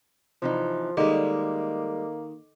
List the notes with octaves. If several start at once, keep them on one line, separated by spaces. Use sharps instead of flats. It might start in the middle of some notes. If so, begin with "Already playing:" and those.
C3 E3 F3 D#4
D#3 G3 G#3 A#3 A4 D#5 D6